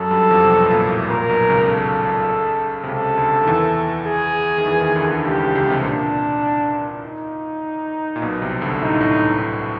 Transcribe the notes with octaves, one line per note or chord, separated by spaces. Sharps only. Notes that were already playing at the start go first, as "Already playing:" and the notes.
Already playing: F#2 F#3 A4
G2 G3
F2 F3
C3
B1 B2
A#2
A2
A#2 A#4
B1 B2
C#2 C#3
A4
C3
C#2 C#3 A4
D2 D3
D#3
E2 E3
G#4
D#3
E2 E3
D#2 D#3
D2 D3
D2 D3
C#2 C#3 G4
C#2 C#3
C#2 C#3
C2 C3
A#2 D4
D#4
A#2
B1 B2
C2 C3
D2 D3
A2 D#4
A2